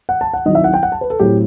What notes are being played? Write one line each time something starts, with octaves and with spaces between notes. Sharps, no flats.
F#5
A5
F#5
D#3 F#3 C4 E4 D#5
E5
F#5
G5
F#5
A5
B4
A4
A2 F#3 C4 E4 G4